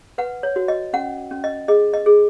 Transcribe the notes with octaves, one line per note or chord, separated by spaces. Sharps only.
B4 F#5
C#5
F#4
D#5
C#4 F#5
C#4
D#5
G#4 D#5
D#5
G#4